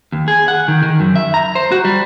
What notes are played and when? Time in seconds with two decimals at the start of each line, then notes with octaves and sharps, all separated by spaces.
0.12 D#2
0.28 G#4
0.48 F#5
0.68 D#3
0.83 D#3
1.00 F#2
1.16 E5
1.34 A#5
1.55 C5
1.72 F#4
1.85 G3